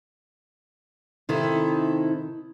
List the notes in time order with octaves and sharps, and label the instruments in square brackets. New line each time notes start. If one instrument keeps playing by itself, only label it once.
[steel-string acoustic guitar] C3 D#3 E4 A4